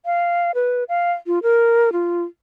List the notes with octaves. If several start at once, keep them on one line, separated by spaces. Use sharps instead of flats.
F5
B4
F5
F4
A#4
F4